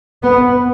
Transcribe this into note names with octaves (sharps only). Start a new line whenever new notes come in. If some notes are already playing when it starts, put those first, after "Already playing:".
B3